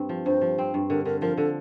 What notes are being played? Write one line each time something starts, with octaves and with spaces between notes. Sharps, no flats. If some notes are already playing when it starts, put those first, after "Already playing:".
Already playing: G2 C4
F3
G2 C5
F3
C4
G2
D3 A#4
D3 A#4
F3 A#4
D3 A4